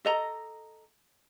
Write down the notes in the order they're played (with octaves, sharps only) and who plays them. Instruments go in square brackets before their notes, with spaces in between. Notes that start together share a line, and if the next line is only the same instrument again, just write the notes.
[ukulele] A4 D#5 A#5